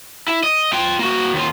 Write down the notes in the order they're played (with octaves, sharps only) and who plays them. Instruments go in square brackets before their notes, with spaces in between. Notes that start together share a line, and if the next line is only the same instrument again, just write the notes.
[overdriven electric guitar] E4
D#5
F4 G5
A#3 F#4
D#2 F4